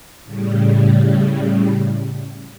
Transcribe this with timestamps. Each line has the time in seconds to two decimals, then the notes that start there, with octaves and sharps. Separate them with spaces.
0.23 A2 C#3 G3